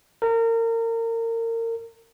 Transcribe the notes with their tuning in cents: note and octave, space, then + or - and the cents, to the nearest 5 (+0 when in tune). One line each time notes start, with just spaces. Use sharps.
A#4 -30